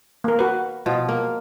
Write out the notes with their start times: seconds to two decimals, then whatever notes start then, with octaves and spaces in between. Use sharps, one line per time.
0.24 A#3 A#4
0.39 F#4 B4
0.86 B2 F3
1.09 A#3